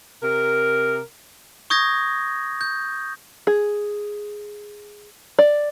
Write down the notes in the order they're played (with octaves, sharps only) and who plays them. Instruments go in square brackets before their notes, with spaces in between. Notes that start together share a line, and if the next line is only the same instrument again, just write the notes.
[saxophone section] C3 A#4
[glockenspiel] C#6 D#6 G6 G#6 A#6
G6
[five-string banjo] G#4
D5